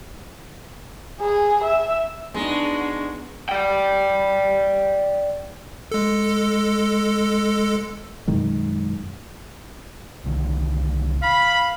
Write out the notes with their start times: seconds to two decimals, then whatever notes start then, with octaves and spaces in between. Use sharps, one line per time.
1.21 G#4
1.63 E5
2.34 G#3 B3 D4 D#4 F#4
3.49 D5 G5
5.92 G#3 A4
8.28 F#2 B2 D#3 G#3
10.24 C2 D3 D#3
11.22 F5 B5